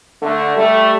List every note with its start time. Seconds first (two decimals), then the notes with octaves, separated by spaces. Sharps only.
0.22 D3 A3
0.56 G3 A3